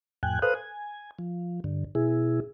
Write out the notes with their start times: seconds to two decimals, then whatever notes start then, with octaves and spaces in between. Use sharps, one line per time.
0.23 F2 A2 G5 G#5 F#6
0.42 A4 B4 C5 F5 D#6 F#6
0.55 G#5
1.19 F3
1.64 G2 D3
1.95 B2 E4 G#4